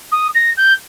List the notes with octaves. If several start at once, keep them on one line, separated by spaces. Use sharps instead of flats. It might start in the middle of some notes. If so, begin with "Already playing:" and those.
D#6
A#6
G6